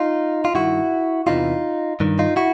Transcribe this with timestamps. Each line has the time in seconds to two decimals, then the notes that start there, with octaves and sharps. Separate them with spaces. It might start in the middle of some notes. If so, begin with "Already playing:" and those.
Already playing: D#4 F4
0.45 F4
0.54 G2 D#3 E4 F#4
1.27 E2 C3 E3 D#4 F4
2.00 G2 D#3
2.19 D#4 F4
2.36 E4 F#4